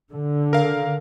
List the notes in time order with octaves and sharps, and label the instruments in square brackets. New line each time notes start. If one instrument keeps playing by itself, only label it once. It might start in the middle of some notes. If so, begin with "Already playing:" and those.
[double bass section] D3
[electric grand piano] A#4 F5